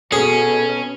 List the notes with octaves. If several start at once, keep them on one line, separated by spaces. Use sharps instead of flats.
B2 C#4 G#4 A4